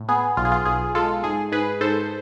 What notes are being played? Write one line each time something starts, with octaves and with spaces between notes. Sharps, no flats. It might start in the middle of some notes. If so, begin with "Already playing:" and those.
Already playing: A2
B3 G#4
B1 F4
G#4
F4
B1 G#4
G#3 F4 A4
G#2 G#4
G#2 G#4 B4
G#2 A4 C5